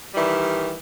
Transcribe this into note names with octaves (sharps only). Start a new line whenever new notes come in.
D#3 E3 G3